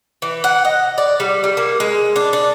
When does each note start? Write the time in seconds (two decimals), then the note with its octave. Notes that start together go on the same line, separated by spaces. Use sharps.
0.22 E3
0.44 F#5
0.65 D#5
0.98 D5
1.20 G3
1.44 G3
1.57 A#3
1.80 G#3
2.16 D4
2.33 D4